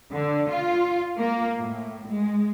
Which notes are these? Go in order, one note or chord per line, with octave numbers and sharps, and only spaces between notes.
D3
F4
A#3
A2
G#3